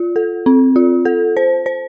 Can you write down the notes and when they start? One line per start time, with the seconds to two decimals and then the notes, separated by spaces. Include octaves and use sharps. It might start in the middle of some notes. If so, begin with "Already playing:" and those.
Already playing: F4
0.16 A4
0.46 C4
0.76 F4
1.05 A4
1.37 C5
1.66 C5